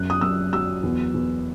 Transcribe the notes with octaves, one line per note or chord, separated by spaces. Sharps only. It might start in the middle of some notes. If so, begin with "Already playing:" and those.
Already playing: F#2 F#6
D#6
F#2 E6
F#3 E6
E2
E2